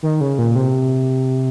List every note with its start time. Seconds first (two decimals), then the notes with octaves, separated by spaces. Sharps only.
0.03 D#3
0.21 C#3
0.38 A#2
0.56 C3